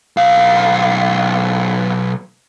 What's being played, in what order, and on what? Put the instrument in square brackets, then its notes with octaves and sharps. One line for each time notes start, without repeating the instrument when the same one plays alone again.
[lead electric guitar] B1 F5